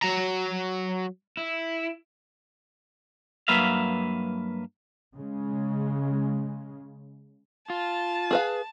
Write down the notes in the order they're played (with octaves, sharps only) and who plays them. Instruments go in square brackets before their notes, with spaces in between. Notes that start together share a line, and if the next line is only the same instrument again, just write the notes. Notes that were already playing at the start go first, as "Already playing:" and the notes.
[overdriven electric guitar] F#3 A#5
[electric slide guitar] E4
[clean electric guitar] G2 F#3 A#3 B4 E5 F5
[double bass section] C#3 G#3
[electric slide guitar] F4 [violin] A5
[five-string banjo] G#4 B4 F5